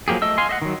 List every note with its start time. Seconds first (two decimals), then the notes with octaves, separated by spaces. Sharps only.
0.08 F3 F#3 A#3 G4 G#4
0.22 A3 D#5 E6
0.38 D#5 F5 G#5 C6
0.49 D#5 E5 F#5
0.62 D#3 F#3